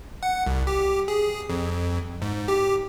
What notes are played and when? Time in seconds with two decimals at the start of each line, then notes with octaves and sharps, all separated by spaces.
0.23 F#5
0.46 C2
0.67 G4
1.08 G#4
1.49 F2
2.22 G#2
2.48 G4